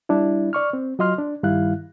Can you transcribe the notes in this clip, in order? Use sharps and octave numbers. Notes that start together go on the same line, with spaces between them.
G3 D4 E4
D5 C#6 F6
C4
F#3 F4 D#5 C6 F6
D4
G2 D#3 G3 E4 F5 F#6